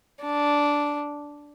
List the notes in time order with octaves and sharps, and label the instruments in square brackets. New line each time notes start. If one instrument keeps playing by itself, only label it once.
[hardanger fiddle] D4